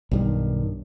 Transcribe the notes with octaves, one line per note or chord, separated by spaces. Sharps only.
B1 G2 D#3